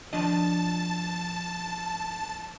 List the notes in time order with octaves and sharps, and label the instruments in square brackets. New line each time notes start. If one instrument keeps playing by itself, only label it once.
[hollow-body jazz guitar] F3 D4 D#5 [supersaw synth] A5